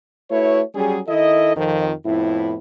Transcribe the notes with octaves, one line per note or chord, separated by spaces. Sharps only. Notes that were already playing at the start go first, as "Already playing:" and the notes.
A3 E4 F#4 B4 C#5
F#3 G3 C#4 G#4
D#3 E4 A4 D#5
F2 D#3 F3
F2 A2 B3 E4